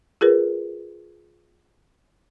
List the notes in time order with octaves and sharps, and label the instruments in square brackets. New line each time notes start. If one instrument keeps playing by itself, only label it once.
[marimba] F4 G#4 A#4 B4